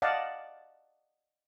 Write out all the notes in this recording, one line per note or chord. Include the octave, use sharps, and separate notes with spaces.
D5 D#5 F5 F#5 A5